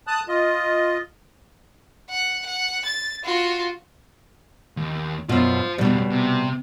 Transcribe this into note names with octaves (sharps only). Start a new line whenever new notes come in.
A5 D#6 F#6
F4 D#5
F#5
F#5
A6
F4 F#4
D#2
F#2 B2 F4 C5
B1 F2 B2 G3
C3